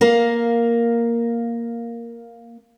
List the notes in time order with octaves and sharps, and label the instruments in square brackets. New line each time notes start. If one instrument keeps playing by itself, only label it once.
[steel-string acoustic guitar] A#3 A#4 F5